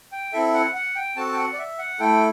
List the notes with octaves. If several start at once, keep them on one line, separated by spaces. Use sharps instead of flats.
G5
C4 E4 A4 E5
F#5
F#5
G5
C4 F#4 A4 A5
G5
F#5
D5
E5
F#5
A3 E4 A4 G5